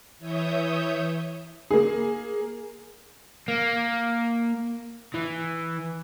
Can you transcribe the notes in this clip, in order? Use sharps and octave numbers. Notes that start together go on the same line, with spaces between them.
E3 C#5 E5 D#6 G6
A#3 G#4
A#3
E3